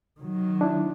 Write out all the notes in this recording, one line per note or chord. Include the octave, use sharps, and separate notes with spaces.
D#3 F#3
D4 E4